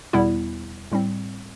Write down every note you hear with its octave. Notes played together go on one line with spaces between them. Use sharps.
E2 B2 G3 B3 E4
A2 G3 C4